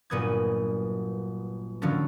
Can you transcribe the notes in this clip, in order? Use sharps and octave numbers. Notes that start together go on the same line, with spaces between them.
G1 A#2 F#3 B3 D#6 G#6
A2 D3 F3 F#3 C#4 A4